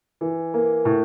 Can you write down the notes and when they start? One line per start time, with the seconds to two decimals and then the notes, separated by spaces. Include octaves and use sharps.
0.21 E3
0.54 A#3
0.85 A2